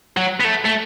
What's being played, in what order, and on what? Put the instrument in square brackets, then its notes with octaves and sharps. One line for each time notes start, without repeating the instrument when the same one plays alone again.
[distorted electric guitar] F#3
B3
A3
A3